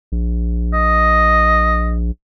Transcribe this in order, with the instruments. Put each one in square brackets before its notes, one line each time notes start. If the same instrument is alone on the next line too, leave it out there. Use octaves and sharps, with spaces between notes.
[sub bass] A#1
[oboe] D#5